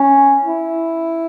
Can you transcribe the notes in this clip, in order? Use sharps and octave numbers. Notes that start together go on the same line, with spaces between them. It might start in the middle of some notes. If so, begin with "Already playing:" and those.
Already playing: C#4
E4